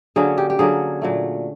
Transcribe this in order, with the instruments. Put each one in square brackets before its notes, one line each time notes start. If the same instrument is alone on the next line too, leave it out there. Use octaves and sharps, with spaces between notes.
[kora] D3 F#3 A#3 C#4 G#4
G4
G4
D3 F#3 A#3 C#4 G#4
A#2 F#3 A3